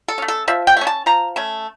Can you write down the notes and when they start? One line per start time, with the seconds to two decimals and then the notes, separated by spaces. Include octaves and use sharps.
0.08 A4
0.18 A3 C#4
0.28 A4
0.48 F3 E5
0.67 G5
0.77 A3 C#4
0.87 A5
1.06 F3 A#5
1.36 A3 C#4 A5